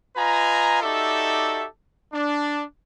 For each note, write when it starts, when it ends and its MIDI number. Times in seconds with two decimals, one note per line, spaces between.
0.17 0.80 65
0.17 0.80 71
0.17 0.80 75
0.17 0.80 80
0.17 0.80 82
0.82 1.65 63
0.82 1.65 66
0.82 1.65 67
0.82 1.65 69
0.82 1.65 74
0.82 1.65 76
2.13 2.64 62